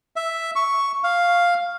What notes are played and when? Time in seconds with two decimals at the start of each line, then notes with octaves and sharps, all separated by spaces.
0.16 E5
0.56 C#6
1.04 F5